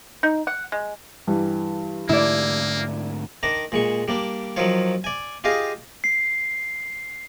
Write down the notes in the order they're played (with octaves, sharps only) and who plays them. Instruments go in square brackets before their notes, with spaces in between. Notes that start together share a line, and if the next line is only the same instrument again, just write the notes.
[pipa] D#4
F#5
G#3
[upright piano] G2 E3 G3
[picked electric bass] G#2 D3 A3 [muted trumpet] A#3 [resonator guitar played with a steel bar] E4 D5
[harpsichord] D#3 D4 A#5
A#2 G#3 C#6
G3 A#3 D4
D#3 F3 F#3 F4 C#5
D5 G#5
F4 G4 G#4 D#5 F5
[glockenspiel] C7